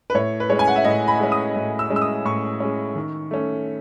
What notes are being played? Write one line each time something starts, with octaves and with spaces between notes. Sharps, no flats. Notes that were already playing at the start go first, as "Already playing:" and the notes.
B4
A2 C#5
B4
G#3 C#4 C#5
G#5
F#5
E5
A2 D#5
B5
G#3 C#4
D#6
A2
E6
G#3 C#4
E6
D#6
A2 C#6
G#3 C#4
D#3
A3 C#4